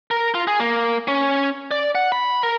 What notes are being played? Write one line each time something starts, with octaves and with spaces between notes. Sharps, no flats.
A#4
F4
G#4
A#3
C#4
D5
F#5
B5
A#4